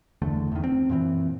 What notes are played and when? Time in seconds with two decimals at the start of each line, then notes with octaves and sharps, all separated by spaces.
0.22 G1 E2 D3 A3
0.52 E2 D#3
0.64 C4
0.89 F#2 A#2 E3 C4